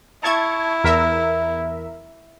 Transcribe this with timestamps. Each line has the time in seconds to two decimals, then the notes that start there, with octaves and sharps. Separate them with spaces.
0.23 E4 A5 C#6 G#6
0.84 E2 A#4 E5